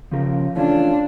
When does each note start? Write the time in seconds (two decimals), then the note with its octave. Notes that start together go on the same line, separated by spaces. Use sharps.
0.11 C#3 F3 C#4 G4 A#4
0.55 E3 A3 C#4 D4 F4